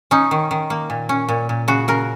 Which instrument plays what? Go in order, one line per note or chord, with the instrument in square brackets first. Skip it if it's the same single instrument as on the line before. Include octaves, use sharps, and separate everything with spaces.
[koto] C#4 D#4
D#3
D#3
A#3
A#2
C#4
A#2
A#2
C#3 F#4
C#3 A#4